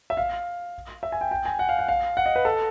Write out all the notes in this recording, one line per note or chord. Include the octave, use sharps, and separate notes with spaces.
E5
F5
E5
G#5
G5
G5
G#5
F#5
F5
F#5
F5
F#5
D#5
B4
A4